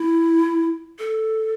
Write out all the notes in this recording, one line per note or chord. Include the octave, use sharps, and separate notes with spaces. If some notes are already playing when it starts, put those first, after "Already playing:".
Already playing: E4
A4